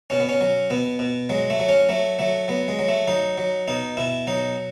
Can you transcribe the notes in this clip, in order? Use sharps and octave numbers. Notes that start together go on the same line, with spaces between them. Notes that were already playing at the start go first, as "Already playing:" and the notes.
B2 C#4
B3
C#4
F#3
B2 B3
B2
F#3 G#3
A3
F#3
C#4
F#3 A3
F#3 A3
F#3 B3
G#3
F#3
A3
F#3 D#4
F#3
B2 D#4
B2 E4
F#3 D#4